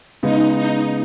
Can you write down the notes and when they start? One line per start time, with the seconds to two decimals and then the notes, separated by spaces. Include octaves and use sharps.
0.22 C#3 G#3 B3 D#4
0.56 D#4